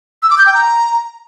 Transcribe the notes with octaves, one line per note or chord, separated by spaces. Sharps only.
E6
D6
G6
G5
A#5